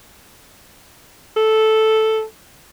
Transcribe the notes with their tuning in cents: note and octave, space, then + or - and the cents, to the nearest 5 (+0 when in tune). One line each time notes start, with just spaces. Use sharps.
A4 -5